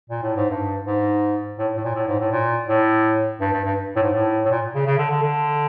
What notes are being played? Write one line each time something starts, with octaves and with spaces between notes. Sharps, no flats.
A#2
A2
G#2
G2
G#2
A2
A2
A#2
A2
G#2
A2
A#2
A2
G2
G2
G2
A2
G#2
A2
A2
A#2
C#3
C#3
D3
D3
D3